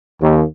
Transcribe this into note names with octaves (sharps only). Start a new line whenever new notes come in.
D#2